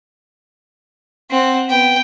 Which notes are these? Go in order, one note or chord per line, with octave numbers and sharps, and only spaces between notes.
C4 F#5
B3 G5